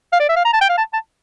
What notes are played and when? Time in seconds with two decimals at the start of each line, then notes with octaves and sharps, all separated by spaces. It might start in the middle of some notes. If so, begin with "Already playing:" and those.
0.12 F5
0.20 D5
0.29 E5
0.36 F5
0.45 A#5
0.53 A5
0.61 G5
0.69 F5
0.78 A5
0.93 A5